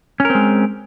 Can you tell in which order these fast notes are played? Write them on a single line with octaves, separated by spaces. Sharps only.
C#4 A#4 C4 G#3